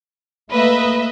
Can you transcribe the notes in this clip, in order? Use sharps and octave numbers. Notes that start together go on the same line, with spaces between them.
A3 A#3 B4 D#5 E5